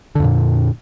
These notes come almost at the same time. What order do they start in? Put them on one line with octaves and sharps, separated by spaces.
D3 F2 A#2